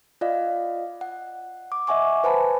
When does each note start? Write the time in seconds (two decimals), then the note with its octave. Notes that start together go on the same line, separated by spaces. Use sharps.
0.21 F4 D5 D#5 F5
1.01 F#5
1.72 D6
1.87 D#5 E5 F#5 G#5 C#6 D6
2.24 B4 C5 G#5 A5 B5